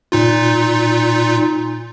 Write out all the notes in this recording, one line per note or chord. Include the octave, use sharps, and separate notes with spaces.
A#2 D#4 F4